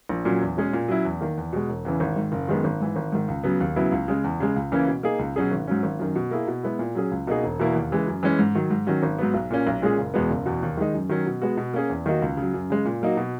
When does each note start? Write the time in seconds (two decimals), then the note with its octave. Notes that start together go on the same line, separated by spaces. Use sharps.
0.09 A#1
0.25 A#2 F#3 C#4
0.41 E2
0.57 B2 G#3 C#4 G#4
0.73 A#2
0.88 F#3 C#4 E4
1.05 E2
1.21 D#3 A#3
1.37 E2
1.53 B2 G#3
1.69 E1
1.85 E2 C#3 E3
2.00 G#1
2.16 G#2 D#3
2.32 F#1
2.48 F#2 D#3 G#3 B3
2.64 G#1
2.81 G#2 E3
2.96 G#1
3.12 G#2 D#3
3.28 C#2
3.44 C#3 F#3 B3
3.60 D#2
3.76 C#3 F#3 B3 E4
3.92 C#2
4.08 C#3 G#3
4.24 E2
4.40 C#3 G#3
4.56 C#2
4.72 C#3 E3 A#3 C#4
4.87 B2
5.03 A#3 D#4 G#4
5.19 C#2
5.36 B2 F#3 C#4 G#4
5.52 G#1
5.67 G#2 F#3 C#4
5.83 G#1
5.99 F#2 D#3
6.15 B2
6.31 A#3 E4 G#4
6.47 B2
6.63 G#3 B3 E4
6.79 A#2
6.95 F#3 C#4 G#4
7.11 C#2
7.27 B2 A#3 D#4 G#4
7.43 E1
7.59 E2 B2 A#3 E4
7.75 D#2
7.91 C#3 E3 G#3
8.07 F#2
8.23 E3 G#3 C#4
8.39 G#2
8.55 D#3 F#3
8.70 G#2
8.87 D#3 F#3 C#4 F#4
9.03 G#1
9.18 G#2 F#3 B3
9.34 B1
9.50 A#2 A#3 C#4
9.67 B1
9.82 A#2 G#3 C#4 G#4
9.98 F#1
10.14 E2 B2 G#3 B3
10.30 F#1
10.46 E2 B2
10.63 D#2
10.77 D#3 G#3 D#4
10.94 F#2
11.09 D#3 F#3 C#4
11.26 B2
11.42 G#3 B3 F#4
11.57 B2
11.74 A#3 C#4 G#4
11.89 E2
12.06 D#3 A#3 D#4 F#4
12.22 C#2
12.37 C#3 F#3
12.53 F#2
12.70 C#3 G#3
12.85 A#2
13.02 F#3 A#3 D#4 F#4
13.17 B2